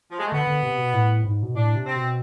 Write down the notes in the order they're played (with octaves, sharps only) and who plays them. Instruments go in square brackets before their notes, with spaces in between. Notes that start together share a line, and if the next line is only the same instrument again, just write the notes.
[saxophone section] F3
G#3
A3
[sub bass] D3 [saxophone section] B3
[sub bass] D3
C3
B2
A2
G#2
B2
[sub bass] A2 [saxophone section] D4
[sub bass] C3
[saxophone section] C4
[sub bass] B2